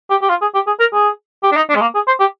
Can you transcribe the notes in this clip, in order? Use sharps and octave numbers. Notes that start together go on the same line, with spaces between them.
G4
G4
F4
G#4
G4
G#4
A#4
G#4
G4
D4
D#4
D4
G#3
A#3
G#4
C5
G4